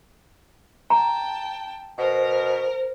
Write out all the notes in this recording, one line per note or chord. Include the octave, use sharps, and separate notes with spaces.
G5 A5 A#5
B2 A#4 C5